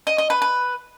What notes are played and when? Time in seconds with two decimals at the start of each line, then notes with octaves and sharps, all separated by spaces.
0.07 D#5
0.18 D#5
0.30 B4
0.42 B4